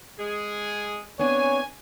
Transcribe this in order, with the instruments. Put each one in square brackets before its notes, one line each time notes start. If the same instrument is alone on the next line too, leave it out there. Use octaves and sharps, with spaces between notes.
[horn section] G#3 G#4
[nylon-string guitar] B3 C4 D4 [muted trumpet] C#5 [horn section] G#5